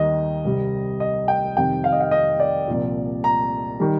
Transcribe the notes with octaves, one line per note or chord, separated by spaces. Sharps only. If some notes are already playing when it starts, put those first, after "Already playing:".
Already playing: D#2 D#3 G3 D#5
C2 C3 G3
D#5
G5
F2 C3 D#3 G3 G5
F5
D#5
F5
D#5
D5
C2 A#2 F3
A#5
D#3 G3